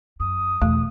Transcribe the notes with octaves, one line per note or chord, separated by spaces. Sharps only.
F#2 D#6
E2 B2 A3